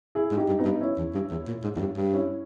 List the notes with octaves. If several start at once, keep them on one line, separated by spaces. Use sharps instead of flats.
E4 G#4
G#2
D#4 G4
G2
B3 D#4
G2
C#4 E4
E2
G2
E2
A#2
G#2
E2
G2
G2
C#4 E4